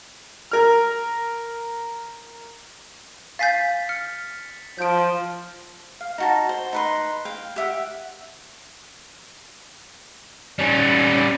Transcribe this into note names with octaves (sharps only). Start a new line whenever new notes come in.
A#4 F6
F5 G#5 G6 A6 B6 C7
F6 C#7
F3 G6 D7
F5
D#4 F#4 A5
C5
D#4 B4 C6
F5 G5
G4 E5 F#5
G3 C#4